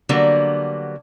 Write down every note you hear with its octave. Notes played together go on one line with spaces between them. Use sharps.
D3 F#3 G3 A#3 B3